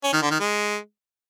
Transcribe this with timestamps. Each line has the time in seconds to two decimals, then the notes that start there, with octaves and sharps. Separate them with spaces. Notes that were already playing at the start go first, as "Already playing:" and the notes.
0.04 C#4
0.13 D#3
0.22 D3
0.31 D#3
0.40 G#3